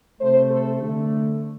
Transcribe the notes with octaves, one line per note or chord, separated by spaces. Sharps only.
C3 A3 C5
A4
D3 A3